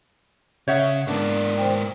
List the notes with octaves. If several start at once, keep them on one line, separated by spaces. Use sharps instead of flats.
C#3 C#5 E5 F#5 G6
G#2 A#3 B3 D4
C5 G5